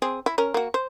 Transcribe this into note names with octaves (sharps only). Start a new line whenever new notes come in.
C4 G#4
E4
C#4 A#4
A#3 F#4
C5